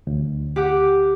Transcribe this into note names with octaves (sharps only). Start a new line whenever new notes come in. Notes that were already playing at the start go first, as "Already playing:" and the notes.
D2
G4 F#5 D6